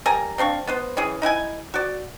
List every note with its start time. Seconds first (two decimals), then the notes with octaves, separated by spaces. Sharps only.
0.06 G3 A#4 G#5 A#5
0.38 C4 D4 F5 C#6
0.67 B3 B4 C5
0.97 E3 C#4 G#4
1.22 D#4 E4 F#5 G#5
1.74 F#4 D5